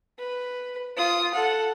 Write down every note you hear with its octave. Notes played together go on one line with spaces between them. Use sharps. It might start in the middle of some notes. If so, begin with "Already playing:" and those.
B4
F4 D#6
A4 F#5